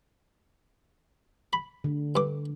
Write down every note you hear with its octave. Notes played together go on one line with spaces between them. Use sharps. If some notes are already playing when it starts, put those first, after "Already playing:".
B5
D3
G2 D6